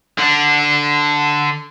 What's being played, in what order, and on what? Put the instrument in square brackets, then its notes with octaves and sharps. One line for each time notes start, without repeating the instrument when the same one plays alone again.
[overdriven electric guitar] D3 D4